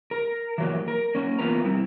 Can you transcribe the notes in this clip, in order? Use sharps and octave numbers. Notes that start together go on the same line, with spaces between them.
A#4
E3 F#3 A#3
A#4
A#3 C#4
E3 B3 F4 A#4 B4 A#5
G3 C4 E4